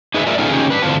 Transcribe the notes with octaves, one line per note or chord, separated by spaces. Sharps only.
D#4 G#4 B4 E5
F4 G#4 A#4 D5 E5
B3 C#4 D#4 F4 G#4 A4
C#3 C#4 D#4 G4 G#4
D4 B4
A2 D3 C4 F4 A5